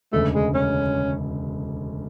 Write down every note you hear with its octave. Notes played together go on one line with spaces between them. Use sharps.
E1 D2 C#3 A3
G#3
C#4